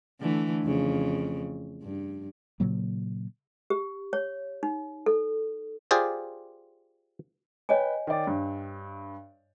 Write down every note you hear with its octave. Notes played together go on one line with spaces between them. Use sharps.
D3 E3 A3
F2 C#3
G2
A#2 C#3 F#3 A#3
G4
C#5
D#4
A4
F4 G4 G#4 C5 D5
B4 C#5 D#5 G5 G#5
D#3 D5
G2